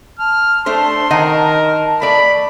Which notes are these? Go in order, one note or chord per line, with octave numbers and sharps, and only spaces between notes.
A5 F6
A3 D4 C5 C6
D#3 A#4 D#5 F#5
A3 D5 B5